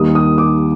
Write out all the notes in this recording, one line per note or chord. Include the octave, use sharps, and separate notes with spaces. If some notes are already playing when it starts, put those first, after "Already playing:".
Already playing: D#2 D#3 G3 D#6
D#6
D6